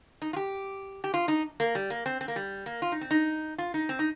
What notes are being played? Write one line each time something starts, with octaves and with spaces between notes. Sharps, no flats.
D#4
F4
G4
G4
F4
D#4
A#3
G3
A#3
C4
C4
A#3
G3
A#3
F4
D#4
C4
D#4
F4
D#4
C4
D#4